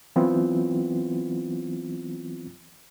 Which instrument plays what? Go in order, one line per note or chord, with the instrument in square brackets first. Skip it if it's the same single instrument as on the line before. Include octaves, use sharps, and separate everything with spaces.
[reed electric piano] E3 F#3 B3 C4 E4 F4